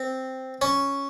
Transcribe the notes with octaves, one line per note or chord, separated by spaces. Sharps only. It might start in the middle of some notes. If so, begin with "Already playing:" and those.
Already playing: C4
C#4